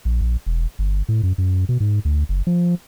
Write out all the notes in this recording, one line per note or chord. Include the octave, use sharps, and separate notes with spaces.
A#1
A#1
E1
G1
A2
F#2
F#2
B2
G#2
D2
F#1
F3